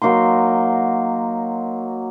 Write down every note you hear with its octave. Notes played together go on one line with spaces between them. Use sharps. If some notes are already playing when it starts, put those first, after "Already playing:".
F#3 A#3 D#4 C6